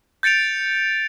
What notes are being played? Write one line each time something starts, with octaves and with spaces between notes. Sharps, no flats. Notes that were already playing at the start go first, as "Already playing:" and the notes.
G6 A6 C#7 D7 F7